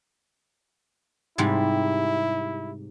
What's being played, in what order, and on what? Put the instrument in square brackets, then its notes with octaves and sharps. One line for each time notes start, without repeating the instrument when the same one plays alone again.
[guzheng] G#2 C3 G3 [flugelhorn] E4